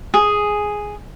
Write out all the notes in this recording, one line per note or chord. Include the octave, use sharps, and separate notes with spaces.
G#4